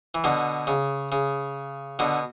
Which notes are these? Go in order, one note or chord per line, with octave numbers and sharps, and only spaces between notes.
E3
B2 D3
C#3
C#3
B2 D3